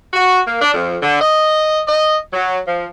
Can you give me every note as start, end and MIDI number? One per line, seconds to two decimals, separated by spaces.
0.13 0.39 66
0.46 0.57 58
0.62 0.72 62
0.74 0.95 41
1.02 1.19 50
1.21 1.78 75
1.87 2.17 75
2.33 2.59 54
2.66 2.85 53